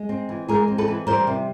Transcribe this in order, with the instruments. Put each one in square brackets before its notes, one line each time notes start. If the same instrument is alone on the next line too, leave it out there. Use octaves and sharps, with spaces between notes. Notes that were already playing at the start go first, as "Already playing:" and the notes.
Already playing: [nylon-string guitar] G#3
C4
E3
G#3 G#4 A#4
C4
A4 B4
E3
G3 A#4 C5
C3